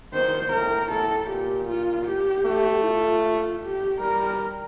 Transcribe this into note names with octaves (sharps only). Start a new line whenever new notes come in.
D#3 C5
A2 A#4
A2 A4
A#2 G4
F4
G4
A3
F4
G4
G3 A#4